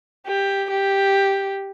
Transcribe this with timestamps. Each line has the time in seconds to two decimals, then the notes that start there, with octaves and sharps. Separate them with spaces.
0.27 G4
0.71 G4